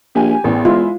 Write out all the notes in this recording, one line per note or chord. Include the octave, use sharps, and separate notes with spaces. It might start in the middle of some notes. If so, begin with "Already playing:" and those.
A#1 G4 G#5
A1 E2
G#3 E4 F4